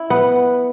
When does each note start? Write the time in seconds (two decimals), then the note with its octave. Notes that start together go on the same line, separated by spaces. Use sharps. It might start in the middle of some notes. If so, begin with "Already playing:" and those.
Already playing: E4
0.10 B3